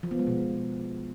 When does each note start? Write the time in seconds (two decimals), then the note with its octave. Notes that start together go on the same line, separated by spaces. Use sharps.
0.03 F3
0.11 B3
0.19 G#3
0.27 B2